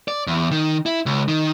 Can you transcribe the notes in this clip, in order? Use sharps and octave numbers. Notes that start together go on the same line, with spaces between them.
D5
E2
D#3
E4
C#2
D#3